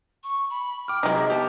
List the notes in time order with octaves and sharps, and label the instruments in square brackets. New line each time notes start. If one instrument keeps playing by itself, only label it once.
[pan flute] C#6
B5
[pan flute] G5 [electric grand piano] D6 F6
[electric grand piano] C3 F#3 [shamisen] G#3 D#4 [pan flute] E5
[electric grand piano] B3 G4 [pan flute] A5